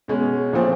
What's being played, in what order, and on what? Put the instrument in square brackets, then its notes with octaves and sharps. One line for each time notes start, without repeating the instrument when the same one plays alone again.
[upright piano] B2 G#3 C#4
A#2 F3 A3 C4